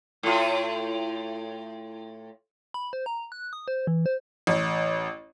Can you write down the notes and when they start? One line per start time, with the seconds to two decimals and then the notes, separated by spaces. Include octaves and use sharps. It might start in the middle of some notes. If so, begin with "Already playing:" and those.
0.23 A2 F4
2.74 B5
2.93 C5
3.06 A#5
3.32 F#6
3.53 D#6
3.68 C5
3.87 E3
4.06 C5
4.47 A1